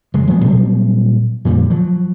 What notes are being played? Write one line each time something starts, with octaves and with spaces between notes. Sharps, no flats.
F1 G#3
D1 F3 G#3 B3
A#2 F#3 G3 C4
F2 A#2 D3 G3
F3 F#3